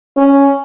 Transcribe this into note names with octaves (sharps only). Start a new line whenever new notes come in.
C#4